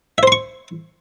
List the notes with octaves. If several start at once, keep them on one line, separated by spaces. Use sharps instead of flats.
C5 E5 C6 C#6